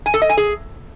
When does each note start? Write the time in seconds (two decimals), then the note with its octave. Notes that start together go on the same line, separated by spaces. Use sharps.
0.06 G#5
0.14 A4
0.22 D#5
0.30 G#5
0.37 G#4